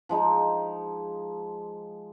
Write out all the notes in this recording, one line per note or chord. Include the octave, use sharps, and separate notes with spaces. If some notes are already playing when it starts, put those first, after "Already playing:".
F3 G#3 D#4